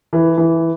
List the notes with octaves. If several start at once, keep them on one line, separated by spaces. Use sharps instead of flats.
E3
E3